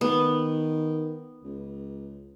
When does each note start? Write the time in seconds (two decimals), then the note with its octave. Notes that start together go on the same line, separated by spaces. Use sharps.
0.01 D#3 B3
1.44 C#2